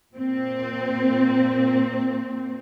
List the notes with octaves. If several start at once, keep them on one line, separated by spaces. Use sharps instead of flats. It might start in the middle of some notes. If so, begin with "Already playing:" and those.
A#2 C4